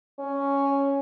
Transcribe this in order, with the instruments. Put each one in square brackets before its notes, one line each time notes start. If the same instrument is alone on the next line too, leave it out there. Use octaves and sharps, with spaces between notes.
[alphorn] C#4